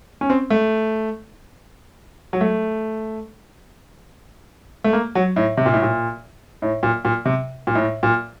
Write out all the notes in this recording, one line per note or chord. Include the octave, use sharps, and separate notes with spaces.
C#4
C4
A3
F#3
A3
A3
A#3
F#3
A2
C3
A#2
A2
A#2
A2
A#2
A#2
C3
A#2
A2
A#2